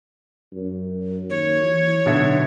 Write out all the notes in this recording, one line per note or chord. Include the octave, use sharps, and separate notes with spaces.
F#2
D#2 C#5
E3
B1 B2 D3 E5